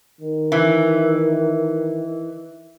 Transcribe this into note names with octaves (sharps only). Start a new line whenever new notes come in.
D#3
E3